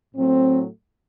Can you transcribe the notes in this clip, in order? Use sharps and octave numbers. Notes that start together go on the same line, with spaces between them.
A2 F#3 A3 C4